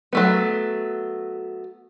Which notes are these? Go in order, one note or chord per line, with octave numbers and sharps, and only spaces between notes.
F#3 A3 B3